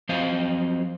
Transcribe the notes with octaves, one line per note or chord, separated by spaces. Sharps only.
F3 F#3 C4 C5 D#5 F5